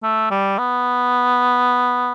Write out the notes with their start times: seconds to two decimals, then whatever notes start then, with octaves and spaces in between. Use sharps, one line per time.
0.03 A3
0.31 G3
0.59 B3